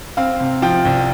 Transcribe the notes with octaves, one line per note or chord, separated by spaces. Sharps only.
C4 F5
C3
F3 G5
C2